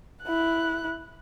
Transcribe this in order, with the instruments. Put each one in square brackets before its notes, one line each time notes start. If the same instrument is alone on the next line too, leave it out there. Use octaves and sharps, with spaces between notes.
[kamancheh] E4 F#6